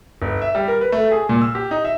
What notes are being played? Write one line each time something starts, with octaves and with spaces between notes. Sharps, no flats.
G1
E5
G3
A#4
B4
A3
G#4
A#2
E6
G4
D#4
E5